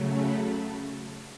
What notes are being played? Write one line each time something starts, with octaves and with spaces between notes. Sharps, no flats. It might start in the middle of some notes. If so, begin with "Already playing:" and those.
Already playing: C#3 F#3 A3
A5 B5